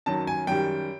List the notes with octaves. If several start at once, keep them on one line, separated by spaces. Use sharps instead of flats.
F#2 D#3 F#3 A5
G#5
F#2 D#3 G3 G5